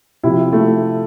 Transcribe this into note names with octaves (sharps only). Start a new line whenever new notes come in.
C3 F3 E4
A3